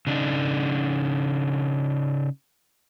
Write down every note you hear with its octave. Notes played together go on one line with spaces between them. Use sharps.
C#3 D4 D#4